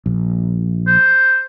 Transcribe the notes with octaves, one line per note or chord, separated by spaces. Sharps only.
A#1
C5